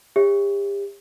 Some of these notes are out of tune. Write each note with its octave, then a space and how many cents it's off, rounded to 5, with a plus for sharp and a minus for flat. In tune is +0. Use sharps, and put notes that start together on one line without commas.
G4 +35 C#5 +0 E5 +0